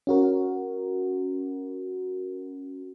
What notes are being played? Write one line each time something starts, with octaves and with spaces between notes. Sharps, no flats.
C#4 F#4 A#4